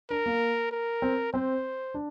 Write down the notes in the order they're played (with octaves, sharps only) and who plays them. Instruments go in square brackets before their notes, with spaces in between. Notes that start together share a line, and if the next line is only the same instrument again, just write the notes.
[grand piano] D4 [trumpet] A#4
[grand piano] A#3
[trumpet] A#4
[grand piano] C4
[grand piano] C4 [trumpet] C5
[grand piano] D4